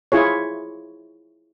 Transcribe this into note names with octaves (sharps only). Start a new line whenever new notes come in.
E4 F4 G#4 C#5